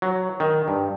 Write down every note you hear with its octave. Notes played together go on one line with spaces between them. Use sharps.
F#3
D#3
G2